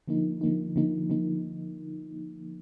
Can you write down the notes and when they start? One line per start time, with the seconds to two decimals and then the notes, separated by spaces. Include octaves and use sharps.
0.08 D3 F3 A#3 D#4
0.41 D3 F3 A#3 D#4
0.76 D3 F3 A#3 D#4
1.10 D3 F3 A#3 D#4